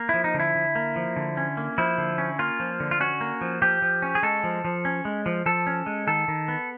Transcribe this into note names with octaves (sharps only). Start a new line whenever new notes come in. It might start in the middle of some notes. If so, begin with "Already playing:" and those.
Already playing: A#3
F3 E4
D#4
D3
E4
D3
A#3
F3
D3
C#4
A#3
F3 E4
D3
C#4
A#3 F4
F3
D3
F4
C#4 F#4
A#3
F3
F3 G4
F3
C#4
G#4
G#3 A4
F3
F3
C#4
G#3
F3
F3 A4
C#4
G#3
D#3 A4
D#3
B3